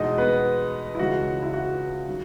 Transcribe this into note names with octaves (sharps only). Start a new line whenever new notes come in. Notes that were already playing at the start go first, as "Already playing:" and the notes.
Already playing: E2 B2 G#3 D#4 D#5
B3 B4
E4
C#2 C#3 E3 G#3 F#4
E4
F#4
D#3 F#3